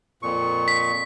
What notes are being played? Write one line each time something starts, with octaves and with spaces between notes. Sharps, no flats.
F2 A#2 C#6
B6